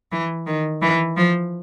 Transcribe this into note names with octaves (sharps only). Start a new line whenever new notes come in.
E3
D#3
E3
F3